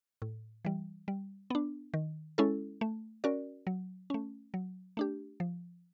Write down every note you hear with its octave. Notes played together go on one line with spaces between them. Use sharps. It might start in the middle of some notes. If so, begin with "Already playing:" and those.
A2
E3 G3
G3
B3 D4
D#3
G#3 C#4 E4 A4
A3
C#4 F#4 A#4 D5
F#3
A3 C#4
F#3
A3 D4 G4
F3